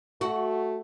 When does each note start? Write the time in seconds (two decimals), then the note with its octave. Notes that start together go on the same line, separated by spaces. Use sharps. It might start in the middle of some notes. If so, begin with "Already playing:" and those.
0.21 A3 F#4